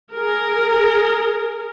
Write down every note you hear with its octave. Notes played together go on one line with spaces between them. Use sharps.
G#4 A#4